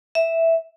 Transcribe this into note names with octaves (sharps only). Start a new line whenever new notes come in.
E5